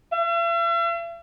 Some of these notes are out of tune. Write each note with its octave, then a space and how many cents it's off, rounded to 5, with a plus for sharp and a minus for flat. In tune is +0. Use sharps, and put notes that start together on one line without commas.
E5 +45